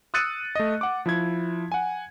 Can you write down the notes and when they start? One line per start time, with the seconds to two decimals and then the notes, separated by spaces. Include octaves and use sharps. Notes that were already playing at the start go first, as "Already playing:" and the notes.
0.14 D#6 E6 F#6 A6 C#7 D#7
0.55 A3 D#5
0.81 F#5 D6
1.06 F3 E4 G#6
1.72 F#5 G#5